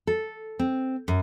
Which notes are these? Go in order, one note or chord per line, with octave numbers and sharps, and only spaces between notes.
A4
C4
F#2